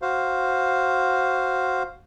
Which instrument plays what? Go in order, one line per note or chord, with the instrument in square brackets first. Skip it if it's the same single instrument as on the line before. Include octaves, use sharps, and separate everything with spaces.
[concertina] F#4 C5 F5